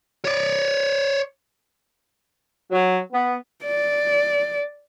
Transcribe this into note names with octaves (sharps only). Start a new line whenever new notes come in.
C#5 D5
F#3
B3
D5